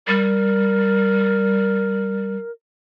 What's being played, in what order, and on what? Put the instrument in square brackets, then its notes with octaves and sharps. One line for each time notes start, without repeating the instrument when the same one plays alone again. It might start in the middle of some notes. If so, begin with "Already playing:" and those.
[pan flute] G3 [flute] A#4